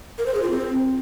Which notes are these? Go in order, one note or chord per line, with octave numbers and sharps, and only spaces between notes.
A#4
C5
G#4
F4
C4